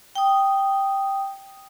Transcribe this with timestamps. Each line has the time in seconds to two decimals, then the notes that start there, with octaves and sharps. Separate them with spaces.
0.15 G5 D#6